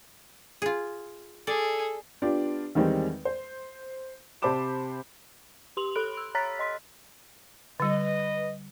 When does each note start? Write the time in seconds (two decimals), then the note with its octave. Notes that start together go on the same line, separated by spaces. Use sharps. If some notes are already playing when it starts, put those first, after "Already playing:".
0.62 F4 G#4
1.47 G#4 A4 D5
2.22 B3 D4 F4 G4 D5
2.75 E2 D#3 G3 G#3 C4
3.25 C5
4.42 C3 C5 A5 B5 D6 E7
5.77 G4 C6 F7 F#7
5.95 A4 B5 F#6 D7
6.17 E6
6.35 C#5 A#5 F6 F#6 A6 B6
6.59 D#5 C6 B6
7.80 D3 G3 B4 D#5